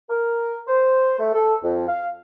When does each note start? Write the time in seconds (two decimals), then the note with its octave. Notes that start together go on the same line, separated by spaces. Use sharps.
0.09 A#4
0.68 C5
1.19 A3
1.34 A4
1.63 F2
1.88 F5